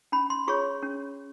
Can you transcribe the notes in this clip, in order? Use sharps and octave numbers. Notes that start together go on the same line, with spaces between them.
C#4 B5
C6
F4 G#4 C#5 C#6
C#4